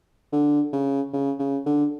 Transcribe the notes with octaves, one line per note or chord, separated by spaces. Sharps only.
D3
C#3
C#3
C#3
D3